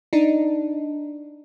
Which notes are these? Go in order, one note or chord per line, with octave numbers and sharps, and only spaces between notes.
D4 D#4